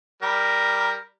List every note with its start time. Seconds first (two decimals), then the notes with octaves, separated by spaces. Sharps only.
0.22 G3 A#4